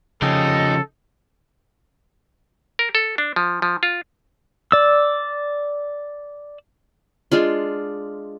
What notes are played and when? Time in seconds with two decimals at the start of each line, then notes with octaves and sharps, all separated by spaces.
0.22 C#3 F3 D#4 G4 A4
2.79 A#4
2.95 A4
3.18 D4
3.36 F3
3.62 F3
3.83 F4
4.72 D5 E6
7.32 G#3 D4 F4